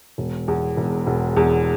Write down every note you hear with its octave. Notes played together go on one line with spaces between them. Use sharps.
E1
E2
E1
E1
E2